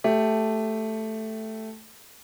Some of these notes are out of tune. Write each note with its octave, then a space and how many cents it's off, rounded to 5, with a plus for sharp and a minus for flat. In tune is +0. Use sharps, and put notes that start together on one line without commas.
A3 +0 G4 +0